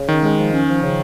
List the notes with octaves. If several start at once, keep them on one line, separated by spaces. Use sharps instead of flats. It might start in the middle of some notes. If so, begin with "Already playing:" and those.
Already playing: C#3
D#3 C#4
G#3
F3
C#4
F3
C#3